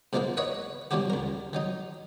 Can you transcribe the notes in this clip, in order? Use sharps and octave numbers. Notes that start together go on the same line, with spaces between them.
G#2 B2 F3 A#3 E4 B4
B4 C#5 D#5 E5 F#5
G2 B2 E3 F#3 F#4 G4
C#2 A#4
D#3 F#3 D#4